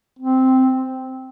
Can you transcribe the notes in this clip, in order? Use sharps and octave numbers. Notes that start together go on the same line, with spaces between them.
C4